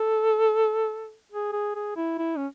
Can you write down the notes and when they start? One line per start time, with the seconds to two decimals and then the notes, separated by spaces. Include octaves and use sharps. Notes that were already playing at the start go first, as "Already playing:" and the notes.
Already playing: A4
1.32 G#4
1.53 G#4
1.75 G#4
1.96 E4
2.18 E4
2.38 C#4